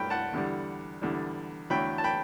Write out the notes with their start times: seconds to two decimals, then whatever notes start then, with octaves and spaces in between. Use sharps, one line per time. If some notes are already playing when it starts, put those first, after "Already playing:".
Already playing: G2 F#3 A3 G5 B5
0.10 F#5 A5
0.33 E2 D3 G3
1.02 E2 D3 G3
1.70 E2 D3 F#3 A3 G5 B5
1.98 A5
2.04 G5 B5